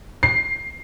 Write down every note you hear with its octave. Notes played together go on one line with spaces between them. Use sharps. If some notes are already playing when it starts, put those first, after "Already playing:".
C7